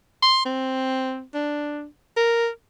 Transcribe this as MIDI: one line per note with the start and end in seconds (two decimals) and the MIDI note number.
0.22 0.43 84
0.45 1.22 60
1.34 1.85 62
2.17 2.48 70